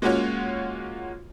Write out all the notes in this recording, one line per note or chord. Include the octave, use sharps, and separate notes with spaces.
G#3 A#3 C#4 F4 F#4 C#5